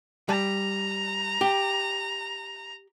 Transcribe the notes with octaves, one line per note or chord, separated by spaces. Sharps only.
G3 A#5
G4